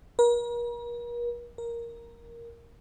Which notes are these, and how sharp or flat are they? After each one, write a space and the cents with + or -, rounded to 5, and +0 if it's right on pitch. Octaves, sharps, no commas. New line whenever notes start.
A#4 +40
A#4 +5